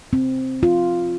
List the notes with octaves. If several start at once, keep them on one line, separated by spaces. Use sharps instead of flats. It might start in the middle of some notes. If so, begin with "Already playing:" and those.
C4
F4